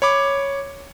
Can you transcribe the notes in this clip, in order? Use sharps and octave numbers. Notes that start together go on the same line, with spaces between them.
C#5 B5 D6